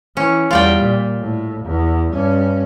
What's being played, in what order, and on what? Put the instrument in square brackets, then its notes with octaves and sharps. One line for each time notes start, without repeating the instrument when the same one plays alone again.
[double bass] E3 [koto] C#4
[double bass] E2 G3 [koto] F4 D5 G5
[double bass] A#2
A2
E2
G2 C#4